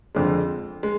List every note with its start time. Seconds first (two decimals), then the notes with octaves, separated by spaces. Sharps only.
0.15 F2 D3 G#3
0.83 G#3